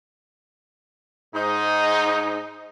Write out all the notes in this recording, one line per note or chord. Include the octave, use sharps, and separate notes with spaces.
G#2 D#4